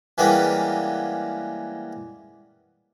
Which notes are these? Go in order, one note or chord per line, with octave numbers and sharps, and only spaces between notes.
E3 G3 G#3 A#3 B3 C#4